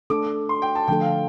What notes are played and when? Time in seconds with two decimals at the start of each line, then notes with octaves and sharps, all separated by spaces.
0.10 A3 D4 A4 D6
0.49 C6
0.62 G5
0.75 A5
0.88 D3 F3 A3 D4 A4 G5
1.01 F5